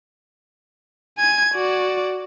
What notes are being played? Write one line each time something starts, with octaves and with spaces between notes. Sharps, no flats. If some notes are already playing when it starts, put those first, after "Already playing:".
G#5 G#6
F#4 D5